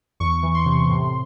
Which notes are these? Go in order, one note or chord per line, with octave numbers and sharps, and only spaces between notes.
E2 C#6
E3
C6
C3
A2